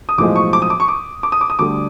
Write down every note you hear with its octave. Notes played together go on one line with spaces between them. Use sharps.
D#6
B1 A2 F3 G#3 D6
C#6
D6
D#6
D6
C#6
D6
D6
D#6
D6
D#6
D2 D3 G3 D6